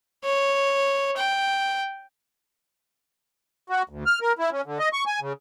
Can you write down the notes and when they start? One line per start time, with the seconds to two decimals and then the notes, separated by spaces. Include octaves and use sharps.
0.25 C#5
1.17 G5
3.70 F#4
3.89 D2
4.06 F6
4.21 A#4
4.39 E4
4.52 C#4
4.66 D3
4.79 D#5
4.93 C#6
5.06 G#5
5.21 C#3